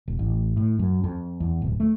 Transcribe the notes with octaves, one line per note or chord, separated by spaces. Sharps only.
E1
A1
A2
F#2
F2
E2
D1
A3